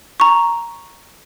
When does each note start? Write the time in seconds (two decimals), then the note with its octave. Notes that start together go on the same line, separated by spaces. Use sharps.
0.20 A#5 C#6